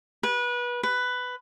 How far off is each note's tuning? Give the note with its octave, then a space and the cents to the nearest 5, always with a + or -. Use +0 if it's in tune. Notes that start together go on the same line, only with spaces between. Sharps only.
B4 -25
B4 +10